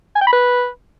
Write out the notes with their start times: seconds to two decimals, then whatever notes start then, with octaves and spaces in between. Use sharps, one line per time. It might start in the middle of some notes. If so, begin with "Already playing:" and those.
0.16 G#5
0.21 G5
0.27 B5
0.32 B4